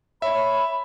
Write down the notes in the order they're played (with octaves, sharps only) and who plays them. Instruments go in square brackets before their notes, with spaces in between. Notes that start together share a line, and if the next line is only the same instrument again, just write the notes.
[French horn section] C#5 [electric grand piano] E5 [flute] B5